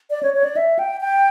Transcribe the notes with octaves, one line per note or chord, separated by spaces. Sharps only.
D5
C#5
C#5
D5
E5
G5
G5